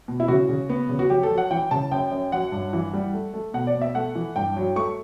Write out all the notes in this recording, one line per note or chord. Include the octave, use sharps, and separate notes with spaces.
B2
E4
C#3 F#4
C#3
B3
C#3
F#4
F#3 G4
A4
F#3
F#5
E3 G5
C#3 A5
F#2 G5
F#2
F#3 F#5
G2
E3
G3
A3
A3
B2 F#5
D5
B2
E5
A3 F#5
E3
G2 G5
F#3
A3 C#6